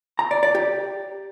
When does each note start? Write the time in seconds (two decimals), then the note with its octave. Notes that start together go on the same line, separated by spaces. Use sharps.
0.19 A#5
0.31 D5
0.43 D5
0.55 G4